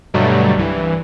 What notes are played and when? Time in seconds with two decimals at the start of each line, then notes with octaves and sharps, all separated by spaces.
0.14 G2 B2 D3 F#3 G3 A3
0.56 C2 G2 E3